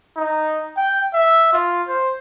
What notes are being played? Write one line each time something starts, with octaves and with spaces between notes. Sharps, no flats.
D#4
G5
E5
F4
C5